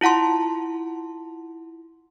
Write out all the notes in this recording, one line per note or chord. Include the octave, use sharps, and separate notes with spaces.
E4 F4 F#5 A5 C6